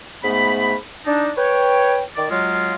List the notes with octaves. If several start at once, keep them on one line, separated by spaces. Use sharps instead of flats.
G#2 A3 B3 B5
D4 D#4 A5
B4 C#5 G5
D#3 D5
F#3 G#3 F4